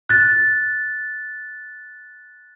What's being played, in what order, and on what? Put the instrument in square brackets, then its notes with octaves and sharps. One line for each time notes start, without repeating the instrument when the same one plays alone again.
[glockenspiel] F#6 A6